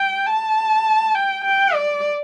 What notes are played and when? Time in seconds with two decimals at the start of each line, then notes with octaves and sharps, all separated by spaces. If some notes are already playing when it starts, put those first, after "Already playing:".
Already playing: G5
0.27 A5
1.15 G5
1.45 G5
1.74 D5